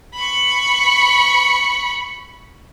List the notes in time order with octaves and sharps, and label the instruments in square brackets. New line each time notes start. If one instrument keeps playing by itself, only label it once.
[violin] B5 C#6